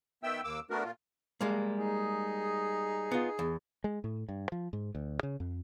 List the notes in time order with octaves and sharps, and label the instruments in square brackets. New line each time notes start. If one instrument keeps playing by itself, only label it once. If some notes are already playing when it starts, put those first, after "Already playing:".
[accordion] D#3 B3 E5 G5 E6
D#2 A#3 D6 E6
A3 B3 D4 F#4 A#4
A#2 F4
[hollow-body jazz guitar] G3 G#3 A#3
[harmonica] D#4 G#4
[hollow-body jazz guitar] B3 F4
E2
[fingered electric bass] G#3
A2
G2
F3
G#2
D2
C#3
F2